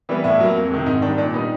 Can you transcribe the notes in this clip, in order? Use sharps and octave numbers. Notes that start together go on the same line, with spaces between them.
E3 G3 B3
A2 E4
F#3 A#3
F2
C3 D#3 G#3
G#2 D#4
D#3 G3 D4
A#2 D4
G3 B3 D#4